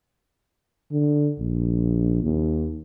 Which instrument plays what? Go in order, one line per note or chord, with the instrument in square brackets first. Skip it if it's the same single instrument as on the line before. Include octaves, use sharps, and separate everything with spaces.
[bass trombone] D3
A#1
D#2